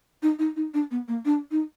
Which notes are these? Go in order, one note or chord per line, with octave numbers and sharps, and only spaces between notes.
D#4
D#4
D#4
D4
B3
A#3
D4
D#4